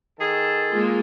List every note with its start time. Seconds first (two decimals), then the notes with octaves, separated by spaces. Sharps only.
0.19 D#3 G#4 A4
0.69 G#3 A#3 F4